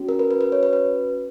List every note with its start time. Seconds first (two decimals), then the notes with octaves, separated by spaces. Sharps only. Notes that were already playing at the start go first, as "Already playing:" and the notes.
Already playing: C#4 F#4
0.09 A#4
0.19 B4
0.31 B4
0.41 B4
0.52 C#5
0.63 B4
0.73 B4